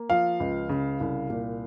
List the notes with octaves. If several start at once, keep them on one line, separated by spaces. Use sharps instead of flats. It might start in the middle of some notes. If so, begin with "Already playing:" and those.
Already playing: A#3
F3 F5
C#2
C#3
C2
A#2